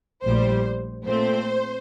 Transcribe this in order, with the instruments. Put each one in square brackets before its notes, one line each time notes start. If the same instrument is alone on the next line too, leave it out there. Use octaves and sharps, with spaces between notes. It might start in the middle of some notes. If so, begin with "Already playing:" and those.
[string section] A#1 A2 G3 C5
A#2 A3 C4 C5